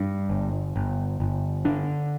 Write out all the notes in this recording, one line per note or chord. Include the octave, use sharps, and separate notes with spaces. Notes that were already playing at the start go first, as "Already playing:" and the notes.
Already playing: G2
G1
G1
G1
D3 D4